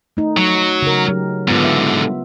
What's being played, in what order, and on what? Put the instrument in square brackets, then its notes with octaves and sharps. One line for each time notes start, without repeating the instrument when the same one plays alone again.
[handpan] A3 D#4
[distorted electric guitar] F#3
[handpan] C#3 A#4
F#3 G4
[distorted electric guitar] G#2 D3 [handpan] B3 F4
[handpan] E5